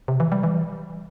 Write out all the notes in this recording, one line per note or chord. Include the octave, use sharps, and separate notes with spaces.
C3
E3
G3
E3